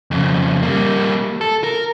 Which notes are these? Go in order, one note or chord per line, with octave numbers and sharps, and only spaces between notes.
F2 C#3
G3 A#3
A4
A#4